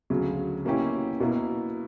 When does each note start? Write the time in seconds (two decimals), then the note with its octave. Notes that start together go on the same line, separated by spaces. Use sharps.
0.10 D2 C#3 F#3
0.65 B2 A#3 C#4 E4 G4
1.20 B2 A#3 E4 A#4